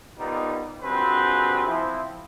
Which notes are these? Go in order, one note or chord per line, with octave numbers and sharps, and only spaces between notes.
A#2 G3 B3 D#4
A#1 G2 C4 F#4 G#4 B4
F3 C4 E4